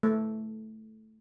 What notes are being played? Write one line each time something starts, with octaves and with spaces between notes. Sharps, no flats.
A3